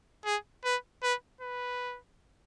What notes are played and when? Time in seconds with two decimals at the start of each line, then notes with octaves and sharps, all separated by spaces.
0.25 G#4
0.64 B4
1.03 B4
1.41 B4